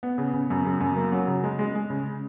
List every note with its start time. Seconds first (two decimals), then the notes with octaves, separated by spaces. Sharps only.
0.03 B3
0.18 C#3
0.34 C#3
0.50 F#2
0.65 C#3
0.80 F#2
0.96 A#3
1.12 F#3
1.27 C#3
1.44 G#3
1.59 G#3
1.75 G#3
1.90 C#3